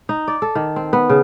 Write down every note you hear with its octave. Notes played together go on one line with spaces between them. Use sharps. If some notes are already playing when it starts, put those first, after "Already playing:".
D#4
D5
A4
D#3
C4
B3
C#3